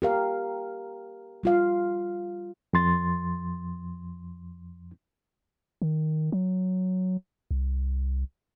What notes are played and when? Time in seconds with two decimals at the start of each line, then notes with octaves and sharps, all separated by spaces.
0.02 G4 A#4 F5
1.43 G3 F4 F5
2.73 F2 F3 C6 A6
5.82 D#3
6.32 F#3
7.51 C2